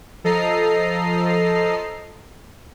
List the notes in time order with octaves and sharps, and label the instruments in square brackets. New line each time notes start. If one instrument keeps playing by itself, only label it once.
[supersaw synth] F3 A4 D#5 A#5 C7